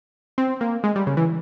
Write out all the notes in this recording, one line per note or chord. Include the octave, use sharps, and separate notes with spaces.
C4
A#3
G#3
G3
C#3
E3